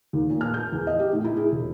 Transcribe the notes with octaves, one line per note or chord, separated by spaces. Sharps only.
D#2
A#2
F6
G6
E2
D#5
G4
A2
E4
G#4
E1